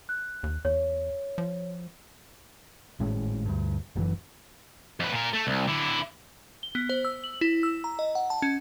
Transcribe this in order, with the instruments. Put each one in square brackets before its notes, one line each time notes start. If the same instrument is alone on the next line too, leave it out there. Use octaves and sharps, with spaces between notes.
[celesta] F#6
[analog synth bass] D#2
[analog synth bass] E2 [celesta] C#5
[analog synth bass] F3
[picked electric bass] G#1 A2 G#3 C#4
D2 G2
F#1 F#2 B2 E3
[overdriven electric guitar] F2 B4
A#2 A#4
A3
C2
D3 E4
[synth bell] G7
B3
C5
E6
F#7
E4
E6
A#5
D#5
F#5
A5
C#4